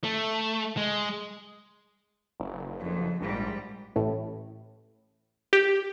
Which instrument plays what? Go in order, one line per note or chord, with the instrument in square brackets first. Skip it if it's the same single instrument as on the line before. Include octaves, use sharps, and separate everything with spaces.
[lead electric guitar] A3
G#3
[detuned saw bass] F#1
[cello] F2
[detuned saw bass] A#1 [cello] G#2 G3
[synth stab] A1 A2
G4